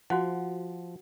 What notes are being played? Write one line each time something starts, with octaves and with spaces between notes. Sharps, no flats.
F3 F#4 C5 F#5